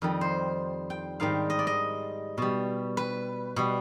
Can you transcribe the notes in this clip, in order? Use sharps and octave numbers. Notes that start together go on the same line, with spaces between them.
F2 D#3 G3
C5
G5
G#2 D#3 G3 F5
D#5
D5
D#5
B2 G3
B4
B2 G3